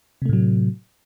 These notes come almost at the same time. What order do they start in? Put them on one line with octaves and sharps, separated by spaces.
C3 A3 A2 F#3